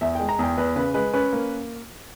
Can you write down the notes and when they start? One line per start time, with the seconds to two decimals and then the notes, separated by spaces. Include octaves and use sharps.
0.01 E2 E5
0.15 G#3 G5
0.29 A#5
0.39 E2 G5
0.57 E2 B4
0.76 C#3 B4
0.94 G#3 B4
1.13 C#4 B4
1.33 A#3